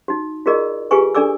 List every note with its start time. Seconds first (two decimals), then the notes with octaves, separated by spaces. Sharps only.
0.08 D#4 F#4
0.46 F4 F#4 G#4 A#4 D5 D#5
0.91 F4 G4 G#4 B4 G#5 C#6
1.15 D4 A4 D5 G#5 D6 E6